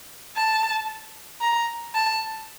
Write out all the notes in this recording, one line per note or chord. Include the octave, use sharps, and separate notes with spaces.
A5
A#5
A5